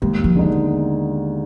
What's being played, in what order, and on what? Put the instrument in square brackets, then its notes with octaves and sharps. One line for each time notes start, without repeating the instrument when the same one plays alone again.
[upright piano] D#2 [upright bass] G#3
[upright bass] F3
[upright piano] D3 G#3 B3 D#4